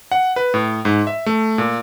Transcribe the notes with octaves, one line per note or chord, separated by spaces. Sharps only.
F#5
B4
A2
G#2
E5
A3
A#2